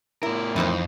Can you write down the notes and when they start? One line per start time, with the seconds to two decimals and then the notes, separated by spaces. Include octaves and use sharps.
0.23 A2 E4 A#4
0.56 F2 E3 D#4 C5